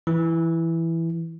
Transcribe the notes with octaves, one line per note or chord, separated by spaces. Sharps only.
E3